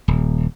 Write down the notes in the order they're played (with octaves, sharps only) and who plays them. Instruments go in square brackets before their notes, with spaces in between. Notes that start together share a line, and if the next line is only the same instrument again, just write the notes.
[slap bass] D#1